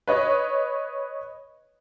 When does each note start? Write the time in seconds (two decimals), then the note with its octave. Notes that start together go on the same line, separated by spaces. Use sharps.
0.07 B4 C#5 D#5